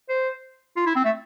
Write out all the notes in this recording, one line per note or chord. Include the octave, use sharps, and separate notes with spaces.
C5
F4
E4
C4
A3